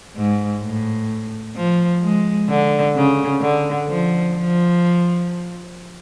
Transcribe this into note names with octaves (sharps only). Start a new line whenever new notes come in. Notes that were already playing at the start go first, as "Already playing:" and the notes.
G#2
A2
F3
G#3
D3
C#3
D3
F3
F3